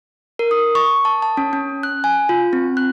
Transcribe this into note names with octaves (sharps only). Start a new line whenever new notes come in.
A#4
D#6
C#6
A5
A5
C#4
C#4
F#6
G#5
F4
C4
F#6